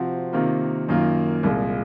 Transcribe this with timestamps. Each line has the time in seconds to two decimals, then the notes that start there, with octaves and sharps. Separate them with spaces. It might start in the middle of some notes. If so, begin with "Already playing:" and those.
Already playing: C3 F3 C4 F#4
0.33 C3 D#3 A#3 F4
0.89 F#2 D#3 A#3 F4
1.43 C2 A#2 G#3